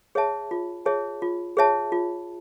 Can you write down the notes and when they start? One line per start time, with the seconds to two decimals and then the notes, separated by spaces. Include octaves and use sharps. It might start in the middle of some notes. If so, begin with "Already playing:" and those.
0.15 G#4 C#5 E5 A5
0.51 F4
0.86 G#4 C#5 E5 A5
1.22 F4
1.57 G#4 C#5 E5 A5
1.92 F4